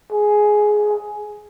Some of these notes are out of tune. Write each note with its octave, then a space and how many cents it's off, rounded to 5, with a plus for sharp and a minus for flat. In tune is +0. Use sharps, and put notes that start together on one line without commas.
G#4 +10